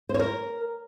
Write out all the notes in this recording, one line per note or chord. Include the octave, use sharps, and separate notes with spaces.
C5
C#5
A#4